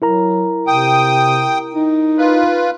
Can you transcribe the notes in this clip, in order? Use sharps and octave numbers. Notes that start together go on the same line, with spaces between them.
F#3 E4 A#4 A#5
C3 G5 D#6
D#4
F4 B4